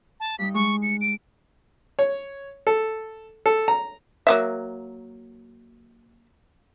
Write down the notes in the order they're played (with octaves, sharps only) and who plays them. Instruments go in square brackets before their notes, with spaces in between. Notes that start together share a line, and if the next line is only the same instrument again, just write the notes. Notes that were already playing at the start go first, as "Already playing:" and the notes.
[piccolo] A5
[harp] G2 G3 D#4 [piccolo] B6
[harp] G#3 [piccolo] C#6
[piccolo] C#7
D7
[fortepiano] C#5
A4
A4
A#5
[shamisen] F#3 A#3 E5